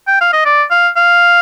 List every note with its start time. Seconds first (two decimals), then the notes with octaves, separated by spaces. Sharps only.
0.07 G5
0.21 F5
0.33 D#5
0.45 D5
0.71 F5
0.96 F5